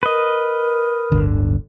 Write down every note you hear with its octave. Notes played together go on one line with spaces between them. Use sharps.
A#4 B4 D#5
D1 G1 D3